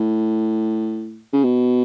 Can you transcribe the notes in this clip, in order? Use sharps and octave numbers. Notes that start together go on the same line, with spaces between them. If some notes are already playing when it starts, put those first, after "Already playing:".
Already playing: A2
C#3
B2